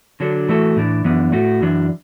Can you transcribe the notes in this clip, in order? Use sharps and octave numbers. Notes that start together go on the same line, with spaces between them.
D3 F#3 D4 A4
E3 A3 F#4 A4
A2 E3 D4
F#2 E3 B3 D4
A2 A3 F#4
F#2 E3 D4